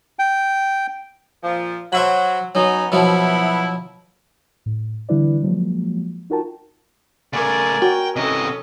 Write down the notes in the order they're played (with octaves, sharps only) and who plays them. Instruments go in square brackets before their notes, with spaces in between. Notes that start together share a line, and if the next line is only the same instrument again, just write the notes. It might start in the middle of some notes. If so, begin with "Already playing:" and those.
[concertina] G5
[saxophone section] A#2 F3
[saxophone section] F#3 [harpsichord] C5 E5 B5
[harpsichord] F#3 [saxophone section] B3 C#4 D#4
[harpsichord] B2 F3 F#3 [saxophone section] B3 E4
[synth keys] A2
D3 E3 G3 E4 B4 D5
F3 F#3 G#3 A#3
D#4 F4 F#4 A#4 G5 A5
[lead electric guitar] C#3 A3 [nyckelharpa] A#4 G#5 [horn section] D5
[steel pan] F#4 [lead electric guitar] G5
[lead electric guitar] C3 E3 [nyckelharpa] C#4 A4 [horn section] D#5